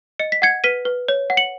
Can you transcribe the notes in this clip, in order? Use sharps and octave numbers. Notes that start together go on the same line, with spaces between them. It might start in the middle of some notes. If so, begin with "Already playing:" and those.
D#5 C#7
B6
F#5 G#6 C#7
B4 B6 D#7
B4
C#5
F#5
C#7 F#7